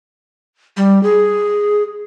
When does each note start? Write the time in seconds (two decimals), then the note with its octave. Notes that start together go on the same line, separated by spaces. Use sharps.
0.77 G3
1.03 G#4